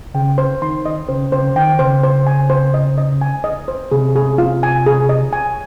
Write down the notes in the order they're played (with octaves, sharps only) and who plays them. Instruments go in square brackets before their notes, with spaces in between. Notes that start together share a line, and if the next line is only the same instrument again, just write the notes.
[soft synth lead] C#3 [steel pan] G5
[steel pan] C5
[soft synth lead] D#3 [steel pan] C6
[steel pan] D#5
[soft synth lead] C#3 [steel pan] C5
[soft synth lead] C#3 [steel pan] C5
[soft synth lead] D#3 [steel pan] G5
[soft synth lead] C#3 [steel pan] C5
[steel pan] C5
G#5
C5
D#5
D#5
G#5
D#5
C5
[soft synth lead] C3 [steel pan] G#4
[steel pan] G#4
F4
G#5
G#4
D#5
G#5